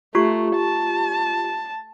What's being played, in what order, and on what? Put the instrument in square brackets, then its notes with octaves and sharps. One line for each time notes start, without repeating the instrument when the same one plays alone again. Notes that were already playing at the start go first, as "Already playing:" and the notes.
[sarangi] A3 [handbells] F4 G4 C#6
[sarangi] A5